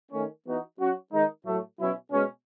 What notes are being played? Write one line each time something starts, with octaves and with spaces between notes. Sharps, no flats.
D#3 A3 C#4
E3 B3 D#4 F#4
F#3 C#4 F#4
D#3 G#3 D#4
A2 F#3 A3
B2 F#3 C#4 E4
B2 G#3 C#4